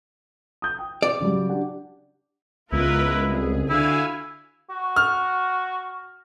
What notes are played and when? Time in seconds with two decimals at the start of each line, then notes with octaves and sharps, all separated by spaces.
0.62 D#6 G6
0.79 G5
1.03 D5
1.20 C#3 F#3 G3
1.49 D4 G4 F#5
2.72 C#2 B3 E4 F4 A#4 B4
3.28 C2 G#4
3.70 D3 E4 F#4 F5 G#5
4.70 F#4
4.96 F6